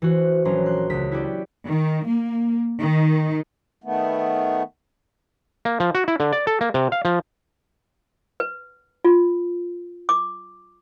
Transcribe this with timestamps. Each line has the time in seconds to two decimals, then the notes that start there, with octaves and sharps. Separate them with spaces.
0.02 E3 F#4 C5
0.45 A#1 F#3 C#4 A#5 C6
0.66 C6 F#6
0.90 C#2 B6
1.12 E4 F#4 G4 D5
1.66 D#3
2.06 A#3
2.79 D#3
3.84 D#3 A3 B3
5.65 A#3
5.80 F3
5.95 F#4
6.08 E4
6.20 D3
6.33 D5
6.47 A4
6.61 A#3
6.74 C3
6.92 F5
7.05 F3
8.40 B4
9.05 F4
10.09 D6